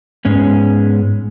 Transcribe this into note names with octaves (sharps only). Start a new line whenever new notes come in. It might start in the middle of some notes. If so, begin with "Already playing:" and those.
G#2 G#3 B3 C#4